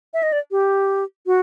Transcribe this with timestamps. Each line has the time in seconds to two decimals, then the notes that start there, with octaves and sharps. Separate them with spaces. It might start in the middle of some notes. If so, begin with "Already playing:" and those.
0.14 E5
0.23 D#5
0.32 D5
0.51 G4
1.26 F#4